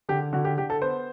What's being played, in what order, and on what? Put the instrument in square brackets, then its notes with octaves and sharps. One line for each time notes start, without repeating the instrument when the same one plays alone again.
[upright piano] D3 G4
D3 F#4
G4
D3 G4
A4
B3 C5